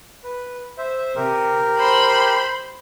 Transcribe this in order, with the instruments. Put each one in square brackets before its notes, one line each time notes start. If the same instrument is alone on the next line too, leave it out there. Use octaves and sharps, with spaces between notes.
[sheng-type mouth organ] B4
C5 E5
[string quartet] C3 [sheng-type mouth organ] G4 A#4
[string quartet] C5 B5 C6